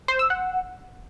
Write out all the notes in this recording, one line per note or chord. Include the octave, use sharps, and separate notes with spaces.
C5
E6
F#5